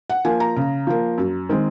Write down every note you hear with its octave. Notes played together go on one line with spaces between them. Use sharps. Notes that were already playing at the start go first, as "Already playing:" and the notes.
F#5
F3 A#3 G#5
A#5
C#3
F3 A#3
F#2
D#3 G#3 C4